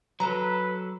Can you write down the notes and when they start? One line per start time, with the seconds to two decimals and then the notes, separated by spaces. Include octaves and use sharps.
0.20 F#3 A4 B4 A#5